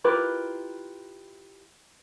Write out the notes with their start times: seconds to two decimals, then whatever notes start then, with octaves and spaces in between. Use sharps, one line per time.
0.04 E4 F4 G4 A#4 B4